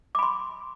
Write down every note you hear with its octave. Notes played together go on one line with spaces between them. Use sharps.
B5 C6 D6